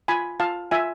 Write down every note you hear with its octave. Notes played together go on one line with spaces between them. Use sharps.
F4 G#5 B5
F4 F5 A5
F4 E5 G#5